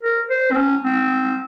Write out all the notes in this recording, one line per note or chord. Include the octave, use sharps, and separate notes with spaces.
A#4
C5
C4
C#4
C4